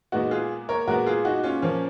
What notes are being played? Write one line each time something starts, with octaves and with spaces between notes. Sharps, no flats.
A#2 G#3 B3 D#4 F#4
F4 G#4
A#4 C#5
A#2 G#3 B3 F#4 A#4
F4 G#4
D#4 F#4
C#4 F4
A#2 F3 A#3 C#4